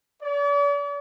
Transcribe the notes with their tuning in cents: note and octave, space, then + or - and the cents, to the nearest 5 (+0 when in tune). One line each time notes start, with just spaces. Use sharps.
D5 -45